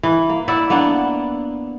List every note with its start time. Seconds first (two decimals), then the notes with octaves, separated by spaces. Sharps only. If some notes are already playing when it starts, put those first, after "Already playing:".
0.03 E3
0.29 A#3
0.48 E4 D5 E5 F#5
0.70 A#3 B3 D4 F#5